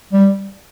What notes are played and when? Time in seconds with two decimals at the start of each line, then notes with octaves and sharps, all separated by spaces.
0.13 G3